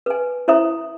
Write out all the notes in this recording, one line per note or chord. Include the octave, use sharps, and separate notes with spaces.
B4 G#5
E4 C5 E5 A#5 D#6